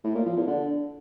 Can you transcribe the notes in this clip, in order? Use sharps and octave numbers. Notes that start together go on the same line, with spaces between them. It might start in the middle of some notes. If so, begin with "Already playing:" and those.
A2
A#2
F3
E2
D3